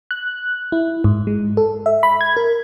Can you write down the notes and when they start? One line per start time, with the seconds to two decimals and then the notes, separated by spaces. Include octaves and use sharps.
0.11 F#6
0.72 E4
1.04 G#2
1.27 G#3
1.57 A4
1.86 E5
2.03 B5
2.21 G#6
2.37 A#4